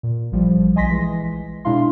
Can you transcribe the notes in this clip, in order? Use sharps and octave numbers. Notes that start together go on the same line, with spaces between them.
A#2
A1 F3 G3
B1 D#5 G#5 C6 A#6 B6
E3 G#3
B2 G#3 D4 E4 F5 C6